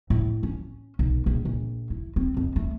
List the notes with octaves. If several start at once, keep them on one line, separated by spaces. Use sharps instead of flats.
A2
C#4
B1
A#1
A#1
E4
C4
F2
A3